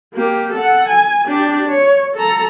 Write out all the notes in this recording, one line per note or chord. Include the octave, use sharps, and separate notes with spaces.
A#3 G4
A4 F#5
G#5
D4 G4
C#5
A4 A#5